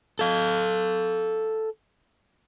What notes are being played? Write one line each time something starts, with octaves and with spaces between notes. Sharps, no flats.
A4 F5